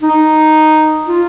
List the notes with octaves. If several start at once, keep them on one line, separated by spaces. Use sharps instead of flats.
D#4
F4